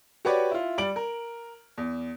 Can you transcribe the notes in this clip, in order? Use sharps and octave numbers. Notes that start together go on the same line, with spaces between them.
F#4 G4 B4 C#5 D5
E4 F4
G3 D5 D7 F#7
A#4
E2